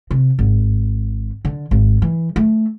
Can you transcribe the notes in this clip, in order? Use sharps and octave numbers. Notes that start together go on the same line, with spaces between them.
C3
G#1
D3
G#1
E3
A3